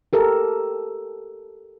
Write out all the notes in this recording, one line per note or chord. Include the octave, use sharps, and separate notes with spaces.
G4 A4 A#4